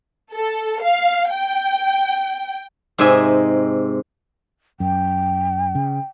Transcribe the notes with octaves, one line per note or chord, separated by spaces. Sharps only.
A4
F5
G5
G#2 C3 D#5 E5 G#5
F#2 G5
C#3